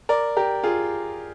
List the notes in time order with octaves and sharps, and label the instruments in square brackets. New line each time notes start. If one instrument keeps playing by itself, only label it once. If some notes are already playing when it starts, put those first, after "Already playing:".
[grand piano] A#4 D5
G4 A#4
F4 G#4